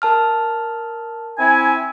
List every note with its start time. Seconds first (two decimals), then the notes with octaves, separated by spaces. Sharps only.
0.02 A#4 A5 F6
1.38 C4 E4 G#5